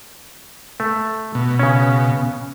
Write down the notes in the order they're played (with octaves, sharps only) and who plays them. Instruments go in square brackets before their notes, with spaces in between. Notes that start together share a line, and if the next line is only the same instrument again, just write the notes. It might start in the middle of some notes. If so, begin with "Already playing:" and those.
[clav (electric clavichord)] A3
[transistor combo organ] B2
[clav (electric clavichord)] C#3 C#4